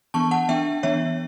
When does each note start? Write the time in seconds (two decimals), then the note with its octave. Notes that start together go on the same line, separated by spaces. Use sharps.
0.14 E3 B3 D4 A5 C#6
0.31 F#5 A5
0.49 E3 B3 D4 E5 G5
0.83 E3 B3 D4 C#5 E5